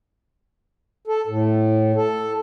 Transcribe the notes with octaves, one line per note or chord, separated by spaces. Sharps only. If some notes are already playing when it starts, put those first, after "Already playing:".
A4
A2
A4